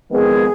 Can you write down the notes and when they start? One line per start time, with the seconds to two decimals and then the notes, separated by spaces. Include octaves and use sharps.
0.11 F2 D#3 G#3 B3 G#4